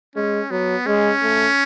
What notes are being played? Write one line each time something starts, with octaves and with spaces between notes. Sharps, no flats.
G#3 C#4
F#3 B3
G#3 C#4
A3